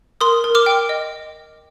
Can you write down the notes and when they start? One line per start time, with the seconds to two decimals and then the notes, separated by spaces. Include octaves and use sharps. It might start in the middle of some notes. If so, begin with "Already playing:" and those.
0.21 A#4 C6 D#6
0.44 A#4
0.55 D6 F6
0.66 G5
0.89 D#5